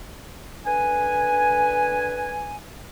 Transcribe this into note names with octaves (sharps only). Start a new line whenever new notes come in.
D3 B4 G#5